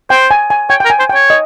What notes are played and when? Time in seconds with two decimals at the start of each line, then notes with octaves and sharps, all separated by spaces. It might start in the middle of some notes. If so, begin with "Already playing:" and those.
0.10 C5 G5
0.31 G#5
0.50 G#5
0.70 C#5 G5
0.80 G5
0.85 A#4
0.90 G#5
1.00 C5
1.09 C#5 G5
1.30 D#5